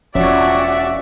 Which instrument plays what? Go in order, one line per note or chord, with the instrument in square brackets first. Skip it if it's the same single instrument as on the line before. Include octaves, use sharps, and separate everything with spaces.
[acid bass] E1 [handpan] F3 C#4 C#5 [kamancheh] F#4 D5 [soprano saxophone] E5